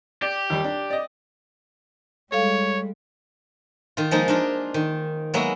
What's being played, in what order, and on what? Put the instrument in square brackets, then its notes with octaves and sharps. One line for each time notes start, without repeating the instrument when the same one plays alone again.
[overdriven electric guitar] G4 [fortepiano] D5
[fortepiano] D#2 G3
D4
D5 D#5
[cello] G3 G#3 [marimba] A4 F5 [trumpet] C#5
[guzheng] D#3 F4
F3 G#3 A#3 D#4 F4
D4 D#4 F4 A#4
D#3
F#3 G#3 A#3 B3 F#4 E5